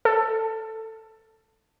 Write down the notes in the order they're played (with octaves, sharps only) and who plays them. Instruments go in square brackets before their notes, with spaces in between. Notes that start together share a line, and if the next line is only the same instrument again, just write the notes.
[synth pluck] A4